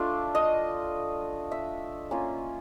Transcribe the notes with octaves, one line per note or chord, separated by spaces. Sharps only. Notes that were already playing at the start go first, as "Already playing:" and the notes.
Already playing: A3 D4 F4 E5
D#5
E5
A#3 C#4 F4